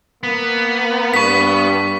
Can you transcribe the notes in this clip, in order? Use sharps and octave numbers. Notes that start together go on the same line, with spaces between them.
A#3 B3
G2 C#6 B6